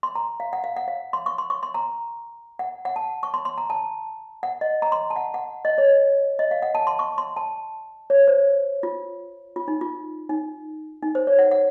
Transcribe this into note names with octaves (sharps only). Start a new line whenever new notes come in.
C6
A#5
F5
F#5
F5
F#5
F5
C6
C#6
C6
C#6
C6
A#5
F#5
F#5
A5
C#6
C6
C6
A#5
A5
F#5
D#5
A#5
C6
A5
F#5
F#5
D#5
C#5
D#5
F5
F#5
A5
C6
C#6
C6
A5
C#5
C5
F4
F4
D#4
F4
D#4
D#4
C5
C#5
F#5
F#5